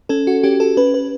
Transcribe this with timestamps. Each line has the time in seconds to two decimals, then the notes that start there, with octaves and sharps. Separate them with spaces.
0.09 C#4 A4
0.27 F#4
0.43 C#4 G4
0.60 A4
0.77 C#4 B4
0.94 B4